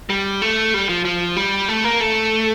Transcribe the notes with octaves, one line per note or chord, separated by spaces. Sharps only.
G3
A3
G3
F3
F3
G3
A3
A#3
A3